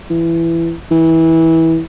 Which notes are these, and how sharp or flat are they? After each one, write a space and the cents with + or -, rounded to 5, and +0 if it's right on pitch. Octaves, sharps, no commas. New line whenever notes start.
E3 +15
E3 -20